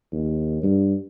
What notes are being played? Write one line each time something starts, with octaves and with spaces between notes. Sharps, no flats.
D#2
G2